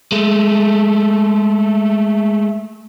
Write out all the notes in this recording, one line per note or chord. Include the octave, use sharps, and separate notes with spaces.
G#3 A3